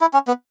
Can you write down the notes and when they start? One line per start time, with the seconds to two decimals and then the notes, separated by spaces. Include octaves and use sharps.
0.01 E4
0.14 C#4
0.27 B3